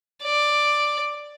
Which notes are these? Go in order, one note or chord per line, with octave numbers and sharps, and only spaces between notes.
D5